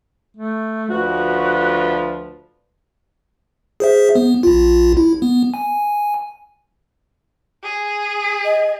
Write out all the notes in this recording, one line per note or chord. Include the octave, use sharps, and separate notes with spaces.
A3
D2 F3 F#4 B4
G#4 C5 E5
B3
A#1 F4
E4
B3
G#5
G#4
D#5